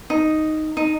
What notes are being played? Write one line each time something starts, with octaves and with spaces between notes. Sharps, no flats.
D#4
D#4